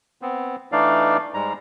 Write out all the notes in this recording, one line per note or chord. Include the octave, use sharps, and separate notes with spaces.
B3 C4
E3 A3 D4 D#4 D5 F5
G#2 G3 G#3 A#5